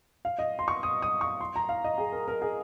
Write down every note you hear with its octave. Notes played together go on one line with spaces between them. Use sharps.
F5
D#5
C6
C#6
D#6
D#6
C#6
C6
A#5
F5
D#5
G#4
A#4
A#4
G#4